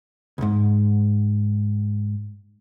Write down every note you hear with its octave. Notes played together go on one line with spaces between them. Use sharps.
C#2 G#2